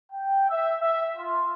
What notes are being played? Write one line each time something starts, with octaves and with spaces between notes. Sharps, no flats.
G5
E5
E5
F4